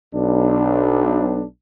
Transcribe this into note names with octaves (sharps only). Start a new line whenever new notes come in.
B1 D4